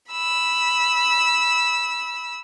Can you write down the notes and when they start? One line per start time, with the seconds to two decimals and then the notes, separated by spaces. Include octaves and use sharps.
0.11 B5 E6